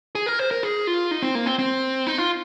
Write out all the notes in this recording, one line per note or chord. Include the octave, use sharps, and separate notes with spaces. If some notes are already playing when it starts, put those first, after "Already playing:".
G#4
A#4
C5
A#4
G#4
F4
D#4
C4
A#3
C4
C4
D#4
F4